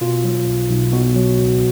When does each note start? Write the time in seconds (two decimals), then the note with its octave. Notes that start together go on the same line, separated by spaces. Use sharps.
0.01 B2 F4
0.24 F#3
0.47 B1
0.70 B1
0.93 B2 F#4
1.16 F#3
1.38 C#2